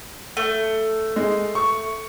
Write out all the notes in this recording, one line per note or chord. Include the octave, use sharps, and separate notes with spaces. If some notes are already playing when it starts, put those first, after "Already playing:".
A3
G#3
C#6